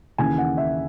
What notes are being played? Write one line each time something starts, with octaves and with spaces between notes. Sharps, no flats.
D#2 C#3 E3 G#5
F#5
E5